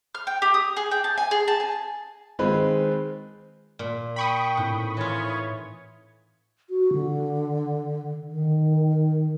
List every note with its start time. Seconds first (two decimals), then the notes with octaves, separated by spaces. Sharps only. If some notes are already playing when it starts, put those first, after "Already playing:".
0.15 F6
0.27 G5
0.42 G4
0.54 D#6
0.77 G#4
0.91 G5
1.04 A5
1.18 G#5
1.31 G#4
1.48 A5
1.60 G#5
2.39 D#3 G#3 C4 F4 B4
3.79 A#2
4.16 G5 B5 C#6 D#6
4.57 A2 C4 D#4 F#5
4.97 E3 F4 C#5
6.70 F#4
6.93 D3
8.30 D#3